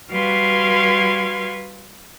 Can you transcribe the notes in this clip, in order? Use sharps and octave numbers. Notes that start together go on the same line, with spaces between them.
G3 F#4 B4 F5 C6 G#6